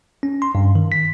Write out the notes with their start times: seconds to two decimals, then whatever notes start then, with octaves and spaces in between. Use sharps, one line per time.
0.23 C#4
0.42 C6
0.55 G2
0.75 D#3
0.92 B6